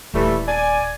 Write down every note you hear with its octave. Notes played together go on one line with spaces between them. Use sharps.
D#1 E3 G3 A3
D5 G#5